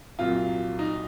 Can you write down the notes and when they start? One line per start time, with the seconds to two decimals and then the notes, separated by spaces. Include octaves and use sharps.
0.19 C2 A#2 F#3 F4
0.79 D#4